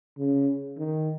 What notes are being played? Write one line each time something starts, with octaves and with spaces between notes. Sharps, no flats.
C#3
D#3